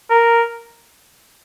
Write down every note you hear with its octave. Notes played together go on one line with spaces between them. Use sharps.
A#4